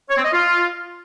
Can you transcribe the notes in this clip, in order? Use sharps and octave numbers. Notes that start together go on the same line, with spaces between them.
C#5
C4
D#5
F4